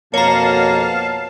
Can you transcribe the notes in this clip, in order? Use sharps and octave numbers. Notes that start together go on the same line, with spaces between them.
F2 B2 A#3 C#5 F5 A5 A#5